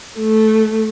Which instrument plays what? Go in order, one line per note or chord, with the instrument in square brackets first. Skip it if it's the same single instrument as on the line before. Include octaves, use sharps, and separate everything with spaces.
[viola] A3